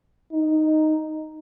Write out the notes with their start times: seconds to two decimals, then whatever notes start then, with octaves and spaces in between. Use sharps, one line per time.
0.32 D#4